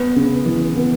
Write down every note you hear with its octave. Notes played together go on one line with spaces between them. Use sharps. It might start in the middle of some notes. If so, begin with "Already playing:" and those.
Already playing: B3
C#3
E3
B3